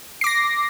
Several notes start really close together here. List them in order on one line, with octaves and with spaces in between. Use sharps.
C7 D6 A#6